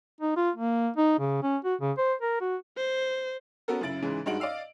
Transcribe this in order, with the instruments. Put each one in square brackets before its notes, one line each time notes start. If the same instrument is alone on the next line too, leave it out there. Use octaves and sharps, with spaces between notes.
[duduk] D#4
F4
A#3
D#4
C#3
C#4
F#4
C#3
C5
A#4
F#4
[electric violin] C5
[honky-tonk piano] B3 C#4 F#4 A4 A#4
F#2 C#3 E4 A6 D7 F#7
G#2 C#3 E3 G#3
G2 G#3 D#4 F#4 D7 F#7
D5 D#5 F5 E6